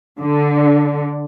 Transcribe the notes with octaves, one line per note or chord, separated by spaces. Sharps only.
D3